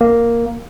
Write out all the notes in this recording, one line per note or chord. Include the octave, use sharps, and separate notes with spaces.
A#3